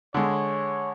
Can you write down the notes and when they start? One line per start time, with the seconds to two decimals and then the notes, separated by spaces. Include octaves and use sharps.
0.14 D3 G#3 C#5